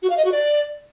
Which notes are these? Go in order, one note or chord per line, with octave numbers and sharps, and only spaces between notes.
F#4
F5
D#5
F#4
D5